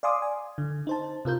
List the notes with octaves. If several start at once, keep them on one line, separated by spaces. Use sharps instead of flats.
D5 F5 G#5 C6 D6 D#6
G#5
D3
D#4 C5 A5
C3 F4 A#4 G6